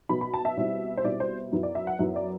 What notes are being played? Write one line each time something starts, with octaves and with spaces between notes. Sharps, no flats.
B2 F#3 B3 B5
B5
A5
E5
B2 G3 C4 E4
C5
B2 G3 C4 E4 D5
C5
F#2 F#3 B3 E4
D5
E5
F#5
F#2 F#3 B3 E4 E5
D5